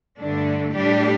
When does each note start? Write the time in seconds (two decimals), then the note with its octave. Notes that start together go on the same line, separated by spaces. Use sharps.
0.19 G2 D3 A3 D4
0.73 A2 G3 D4 G4